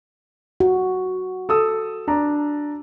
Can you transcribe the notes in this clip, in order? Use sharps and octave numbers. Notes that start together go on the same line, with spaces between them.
F#4
A4 D#6 E6
D4 A#5